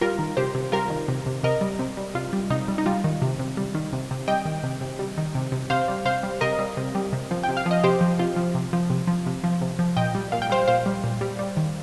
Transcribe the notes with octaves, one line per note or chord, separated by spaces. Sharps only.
G3 F4 A#4
D#3
C3 G4 C5
C3
G3 F4 A#4
D#3
C3
C3
C3 A#4 D#5
G3
C3
G3
C3 F4
G3
C3 D#4
G3
D#4
G3 F4
D#3
C3
C3
G3
D#3
C3
C3
G3 D#5 G5
D#3
C3
C3
G3
D#3
C3
C3
C3 C5 F5
G3
C3 C5 F5
G3
C3 A#4 D#5
G3
C3
G3
C3
F3
G5
C3
F5
F3
D#5
C3 G4 C5
F3
C3 F4
F3
C3
F3
C3
F3
C3
F3
C3
F3
A#2 D#5 G5
G3
A#2 F5
G5
G3 C5 F5
A#2 C5 F5
G3
A#2
G3
G3
D#3